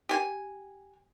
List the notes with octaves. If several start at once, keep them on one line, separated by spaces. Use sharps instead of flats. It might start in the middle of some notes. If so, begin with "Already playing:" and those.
G4 G#5